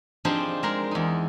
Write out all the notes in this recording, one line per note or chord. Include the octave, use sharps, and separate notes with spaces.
F3 C4 D4 D#4 G4 G#4
G#3 A#4
E2 D#4